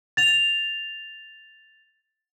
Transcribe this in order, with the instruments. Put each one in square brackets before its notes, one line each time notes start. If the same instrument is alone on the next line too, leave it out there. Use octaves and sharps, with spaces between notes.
[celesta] A6 F7